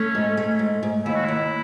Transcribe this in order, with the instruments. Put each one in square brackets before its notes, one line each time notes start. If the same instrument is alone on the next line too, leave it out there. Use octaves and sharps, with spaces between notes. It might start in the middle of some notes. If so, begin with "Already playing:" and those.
Already playing: [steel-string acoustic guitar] A3 [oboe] C#4
[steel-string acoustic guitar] G#2
A3
G#2
G#2
[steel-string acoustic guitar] D#2 [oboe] E4
[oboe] F#4
[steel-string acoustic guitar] D#2 [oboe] E4